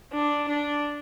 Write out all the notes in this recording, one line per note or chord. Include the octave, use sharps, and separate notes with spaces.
D4
D4